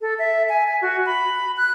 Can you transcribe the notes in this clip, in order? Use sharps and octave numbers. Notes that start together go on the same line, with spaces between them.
A4
E5
G#5
G#5
F#4
B5
F#6